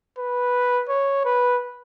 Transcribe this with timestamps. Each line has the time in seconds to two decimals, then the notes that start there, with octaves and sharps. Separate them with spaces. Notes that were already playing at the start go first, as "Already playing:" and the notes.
0.18 B4
0.89 C#5
1.25 B4